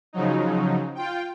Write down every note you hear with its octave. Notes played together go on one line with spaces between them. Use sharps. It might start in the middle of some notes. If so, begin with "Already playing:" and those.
C#3 F3 F#3 D#4
F4 G5